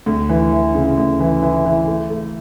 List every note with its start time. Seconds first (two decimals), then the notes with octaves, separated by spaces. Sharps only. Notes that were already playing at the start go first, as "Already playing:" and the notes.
0.06 D2
0.29 E3
0.52 E3
0.75 C#3
0.97 D2
1.20 E3
1.43 E3
1.65 E3
1.87 A3
2.10 A3